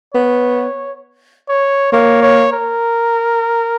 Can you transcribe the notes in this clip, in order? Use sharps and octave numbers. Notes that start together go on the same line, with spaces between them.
B3 C#5
C#5
A#3 C#5
C#5
A#4